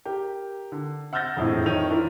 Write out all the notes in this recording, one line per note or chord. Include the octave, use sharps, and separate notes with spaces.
G4 A#4
D3
F#5 E6 F6 G6 A6 A#6
E1 F2 A2
F2 D#3 C#5 G6 D#7 F7
E3 D4 E4 F4 A#4 E5